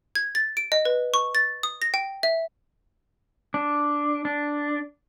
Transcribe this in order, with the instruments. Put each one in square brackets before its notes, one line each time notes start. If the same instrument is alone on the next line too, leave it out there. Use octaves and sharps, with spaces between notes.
[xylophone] G#6
A6
D7
D#5
B4
C#6
A6
D#6
A#6
G5
E5
[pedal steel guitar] D4
D4